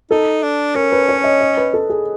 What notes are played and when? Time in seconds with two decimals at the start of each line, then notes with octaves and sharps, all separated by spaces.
0.11 D#4 A4
0.43 D4
0.75 C#4 A#4
0.92 B4
1.08 C#5
1.24 D#5
1.41 D#5
1.57 B4
1.74 A4
1.90 G#4